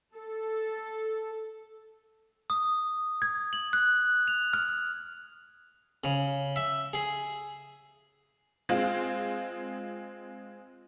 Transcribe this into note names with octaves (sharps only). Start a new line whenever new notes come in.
A4
D#6
G#6
F#7
F#6
F7
F6
C#3
E5
G#4
G#3 C4 F4